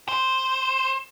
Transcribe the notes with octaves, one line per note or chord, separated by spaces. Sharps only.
C5